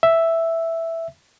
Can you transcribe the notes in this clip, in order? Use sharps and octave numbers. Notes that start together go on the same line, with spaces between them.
E5